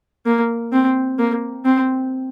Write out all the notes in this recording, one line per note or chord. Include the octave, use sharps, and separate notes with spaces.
A#3
C4
A#3
C4